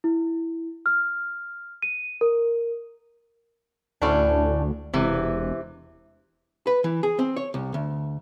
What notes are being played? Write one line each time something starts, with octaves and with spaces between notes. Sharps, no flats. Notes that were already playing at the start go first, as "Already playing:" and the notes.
E4
F6
D#7
A#4
D2 A2 C#4 D4
E1 C3 E3
B4
E3
G#4
C4
C#5
C2
D2